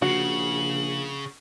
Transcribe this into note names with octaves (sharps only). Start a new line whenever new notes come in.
A#1 C#3 F#4 F#7